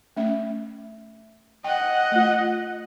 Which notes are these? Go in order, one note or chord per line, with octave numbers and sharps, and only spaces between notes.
A3 C#4 E5
D#5 F#5 G5
A3 F4